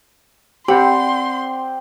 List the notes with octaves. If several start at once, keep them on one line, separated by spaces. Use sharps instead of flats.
C4 G4 D5 F#5 B5 C6